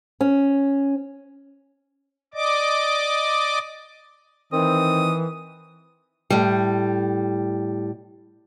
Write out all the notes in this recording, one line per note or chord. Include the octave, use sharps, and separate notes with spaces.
C#4
D5 D#5 D6
D#3 E3 C4 D#6
A2 G3